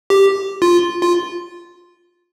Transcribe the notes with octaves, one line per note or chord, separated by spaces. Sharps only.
G4
F4
F4